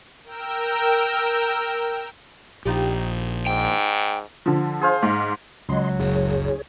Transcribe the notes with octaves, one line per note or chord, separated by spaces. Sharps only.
A#4 G5 E6
A#1 D#4 F4 G4
G#2 G5
D3 F3
G#4 C5 F5
G#2
C#2 F#3 D#5 C6
F#1 G#4 C#5